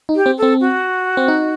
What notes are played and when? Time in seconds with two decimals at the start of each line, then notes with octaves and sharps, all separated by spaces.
0.09 D#4
0.15 G4
0.26 C4
0.37 A4
0.42 C4
0.60 F#4
1.17 C4
1.28 D#4